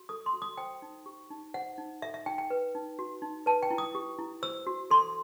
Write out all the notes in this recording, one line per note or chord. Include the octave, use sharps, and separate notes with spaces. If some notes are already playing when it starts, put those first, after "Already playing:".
Already playing: F#4
A4 D#6
C6
F#4
D#6
C5 G5
D#4
G4
D#4
C5 F#5
D#4
A4 E5
E5
D#4 G5
G5
B4
D#4
F#4
D#4
B4 A5
G5
E4
D#6
G4
E4
C5 E6
F#4
A4 C6